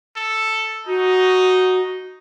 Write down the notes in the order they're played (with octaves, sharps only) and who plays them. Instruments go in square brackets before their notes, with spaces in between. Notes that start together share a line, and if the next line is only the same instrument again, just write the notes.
[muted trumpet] A4
[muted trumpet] D#4 [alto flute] F#4